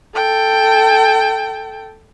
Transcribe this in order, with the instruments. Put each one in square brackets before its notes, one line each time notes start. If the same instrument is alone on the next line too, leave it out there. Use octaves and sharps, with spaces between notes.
[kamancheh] A4 G5